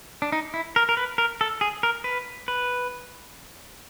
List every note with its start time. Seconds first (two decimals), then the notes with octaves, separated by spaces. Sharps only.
0.22 D4
0.32 D#4
0.54 E4
0.76 A#4
0.89 A#4
0.97 B4
1.18 A#4
1.41 A4
1.61 G#4
1.83 A#4
2.04 B4
2.48 B4